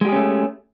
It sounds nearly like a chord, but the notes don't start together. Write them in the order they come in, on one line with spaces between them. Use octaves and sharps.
G#3 G4 G#4 C#4 A3